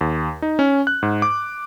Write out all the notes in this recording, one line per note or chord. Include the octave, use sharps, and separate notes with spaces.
D#2
D#4
C#4
F#6
G#2
D6